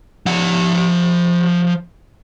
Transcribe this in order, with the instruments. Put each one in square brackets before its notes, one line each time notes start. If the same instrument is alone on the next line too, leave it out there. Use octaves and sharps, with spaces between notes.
[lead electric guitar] F3 F#5